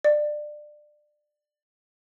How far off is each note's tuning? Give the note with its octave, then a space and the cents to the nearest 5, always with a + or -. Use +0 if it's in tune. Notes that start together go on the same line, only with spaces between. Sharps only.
D5 +20